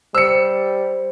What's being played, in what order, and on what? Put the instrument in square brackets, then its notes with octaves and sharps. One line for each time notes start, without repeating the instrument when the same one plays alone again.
[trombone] G3 [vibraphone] C5 [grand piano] E6 C#7